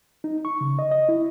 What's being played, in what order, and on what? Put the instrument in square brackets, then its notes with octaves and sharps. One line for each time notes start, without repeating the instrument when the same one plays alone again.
[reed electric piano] D#4
C#6
C#3
D#5
D#5
E4